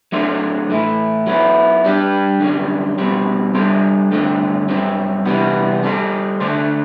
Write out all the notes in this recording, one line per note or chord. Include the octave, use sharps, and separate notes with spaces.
F#3 A3 D4 A4 C5
A2 E3 A3 E4
F#3 B3 E4
G3 D4 G4
F#2 D3 G3
B2 G3 C4
G3 D4 A4 C5
G2 D3 A3 C4
G2 F#3 C4
C3 E3 G3 B3
G3 D4 A4 C5
D3 A3 D4 A4 C5